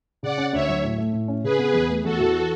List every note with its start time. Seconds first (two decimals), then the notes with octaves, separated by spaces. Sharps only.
0.22 C#3 D5 F#5
0.38 C#4
0.53 D2 C#5 E5
0.69 F#3
0.83 A2
0.98 A3
1.13 A2
1.28 C#4
1.43 C#3 G#4 B4
1.59 B3
1.73 E2
1.90 A3
2.04 E2 F#4 A4
2.20 E3